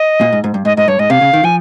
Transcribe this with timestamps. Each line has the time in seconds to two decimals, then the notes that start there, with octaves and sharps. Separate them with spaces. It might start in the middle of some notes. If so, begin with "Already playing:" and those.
Already playing: D#5
0.21 A#2
0.33 G#2
0.44 G#2
0.54 G2
0.65 G#2 D#5
0.77 G#2 D#5
0.88 G2 C#5
0.99 G#2 D#5
1.10 C3 F5
1.21 C#3
1.33 D#3
1.43 F3 G#5